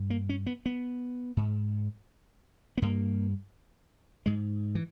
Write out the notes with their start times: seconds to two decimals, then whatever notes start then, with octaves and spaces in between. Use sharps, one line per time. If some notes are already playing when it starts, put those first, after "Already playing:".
Already playing: G2
0.10 A#3
0.29 C#4
0.46 B3
0.66 B3
1.37 G#2
2.78 B3
2.82 G2 A#3
4.26 G#2 G#3
4.75 E3